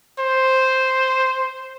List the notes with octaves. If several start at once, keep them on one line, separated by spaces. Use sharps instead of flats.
C5